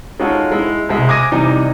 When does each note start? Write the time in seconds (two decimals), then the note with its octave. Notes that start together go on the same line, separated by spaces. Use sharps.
0.20 G#3 C#4 D#4 F4 F#4 A4
0.52 G#3 E4
0.89 C2 B2 G#3 E5
1.08 G#5 D6 D#6 G#6 A#6 D#7
1.32 C3 E3 G3 D#4